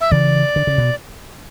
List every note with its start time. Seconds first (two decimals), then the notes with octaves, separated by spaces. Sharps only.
0.01 E5
0.11 C#3 E3 D5
0.56 D3
0.67 C#3
0.78 B2